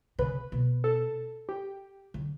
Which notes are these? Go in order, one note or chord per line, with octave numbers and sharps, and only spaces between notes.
C#3 B4
B2
A4
G4
D3